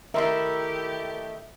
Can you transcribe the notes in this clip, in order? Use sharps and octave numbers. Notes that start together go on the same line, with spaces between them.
D#3 A3 E4 G4 A#4 E5 C6